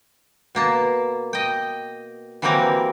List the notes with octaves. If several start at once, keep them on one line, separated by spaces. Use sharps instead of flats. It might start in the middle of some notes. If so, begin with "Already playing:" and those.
B2 A#3 A5
D#5 G5
E3 F#3 G3 A#3 C4 A#4